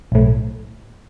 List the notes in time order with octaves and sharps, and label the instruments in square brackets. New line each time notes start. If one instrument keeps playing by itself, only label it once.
[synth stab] B1 A2